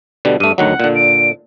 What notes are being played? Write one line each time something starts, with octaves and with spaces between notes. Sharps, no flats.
B2 D3 G3
G2 A3 D#7
D2 D#3 F#3 F#5
A#2 D3
D7